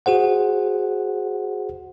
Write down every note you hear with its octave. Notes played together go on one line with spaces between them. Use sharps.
F#4 G#4 C5 F#5